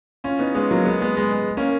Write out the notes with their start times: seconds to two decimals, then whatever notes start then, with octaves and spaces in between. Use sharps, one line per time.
0.24 C#4 F4
0.39 B3 D#4
0.55 G#3 B3
0.71 F#3 A#3
0.85 G#3 B3
1.01 G#3 B3
1.17 G#3
1.32 G#3
1.57 A#3 C#4